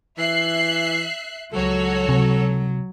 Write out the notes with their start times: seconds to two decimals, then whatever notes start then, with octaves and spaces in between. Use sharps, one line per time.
0.18 E3 E5 F#6 C7
1.53 C#2 F#3 F#4 A4 C#5
2.09 C3 F#3